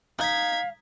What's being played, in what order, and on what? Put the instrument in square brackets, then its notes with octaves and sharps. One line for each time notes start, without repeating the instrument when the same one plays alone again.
[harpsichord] D#4 D#5 [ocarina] F5 [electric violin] G#6 B6